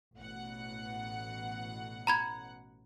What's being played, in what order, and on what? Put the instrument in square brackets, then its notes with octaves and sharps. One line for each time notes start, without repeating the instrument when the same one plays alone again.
[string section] A1 B2 F#5
[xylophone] A#5 B5 G#6